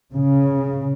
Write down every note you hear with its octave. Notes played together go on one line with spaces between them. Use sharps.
C#3